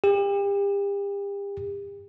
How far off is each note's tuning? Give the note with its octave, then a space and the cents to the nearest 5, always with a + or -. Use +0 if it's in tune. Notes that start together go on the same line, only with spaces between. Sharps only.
G4 +35